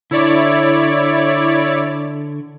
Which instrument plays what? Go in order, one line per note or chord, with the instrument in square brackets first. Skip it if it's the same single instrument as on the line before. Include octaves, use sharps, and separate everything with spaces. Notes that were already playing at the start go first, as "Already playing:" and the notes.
[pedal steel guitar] D3 [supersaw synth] E4 C#5 D5